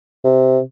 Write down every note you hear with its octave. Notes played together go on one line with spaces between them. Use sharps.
C3